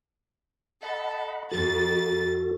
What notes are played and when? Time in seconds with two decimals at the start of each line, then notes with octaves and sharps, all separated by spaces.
0.83 A4 D#5 F#5 B5
1.52 F2 F#4 A4 A6